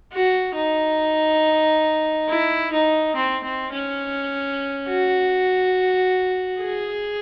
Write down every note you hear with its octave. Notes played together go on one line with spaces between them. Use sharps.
F#4
D#4
E4
D#4
C4
C4
C#4
F#4
G#4